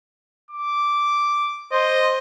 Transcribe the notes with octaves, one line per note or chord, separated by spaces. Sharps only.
D6
C5 D#5